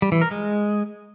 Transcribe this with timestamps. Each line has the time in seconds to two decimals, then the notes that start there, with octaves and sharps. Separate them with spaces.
0.02 G3
0.12 E3
0.22 A#4
0.31 G#3